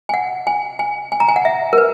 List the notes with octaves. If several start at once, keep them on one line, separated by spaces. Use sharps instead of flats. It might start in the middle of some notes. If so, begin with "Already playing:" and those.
G#5
F#5
G#5
G#5
G#5
A#5
G#5
F#5
E5
A#4
B4